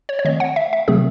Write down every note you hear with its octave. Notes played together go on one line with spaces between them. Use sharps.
C#5
C#5
D#3 A3 C4 D#5
F#5
E5
E5
C3 D#3 F#3 A3 C4 G#4